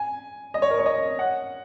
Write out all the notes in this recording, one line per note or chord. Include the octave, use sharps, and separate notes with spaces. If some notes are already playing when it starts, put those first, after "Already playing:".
Already playing: G#5
D#5
C#5
A#4
C#5
D#5
F#5